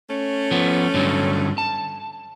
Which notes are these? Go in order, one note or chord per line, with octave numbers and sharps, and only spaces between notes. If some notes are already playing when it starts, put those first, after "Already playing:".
A3 C#4
F3 B3
G2 D3 F#3
A5